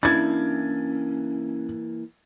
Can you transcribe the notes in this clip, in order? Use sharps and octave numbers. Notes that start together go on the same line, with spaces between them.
E3 A#3 C#4 D4 E4 B5 G#6 A6